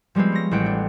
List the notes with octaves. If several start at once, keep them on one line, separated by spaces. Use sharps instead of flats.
F3 G3 G#3 B3 C4
C#4 A#6
A1 C4 F#5 G5
D4